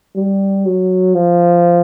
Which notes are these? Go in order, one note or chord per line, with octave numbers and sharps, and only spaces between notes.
G3
F#3
F3